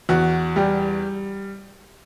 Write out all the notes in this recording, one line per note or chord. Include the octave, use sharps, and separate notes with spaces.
E2 F#4
G3 G4